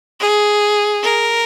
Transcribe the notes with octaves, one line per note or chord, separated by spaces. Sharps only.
G#4
A#4